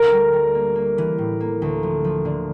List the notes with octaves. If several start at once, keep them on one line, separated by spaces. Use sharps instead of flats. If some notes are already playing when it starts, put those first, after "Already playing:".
Already playing: D2 A#4
G3
G3
A#3
A#3
E3
A2
A#3
D2
F3
F3
D3